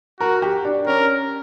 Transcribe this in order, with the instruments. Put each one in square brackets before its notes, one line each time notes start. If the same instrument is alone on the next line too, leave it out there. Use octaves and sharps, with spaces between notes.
[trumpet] F#4 [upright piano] A#4
[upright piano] G4
D4
[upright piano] C#4 [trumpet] A#4